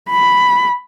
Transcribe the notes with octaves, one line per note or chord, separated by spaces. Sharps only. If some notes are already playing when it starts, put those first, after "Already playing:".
B5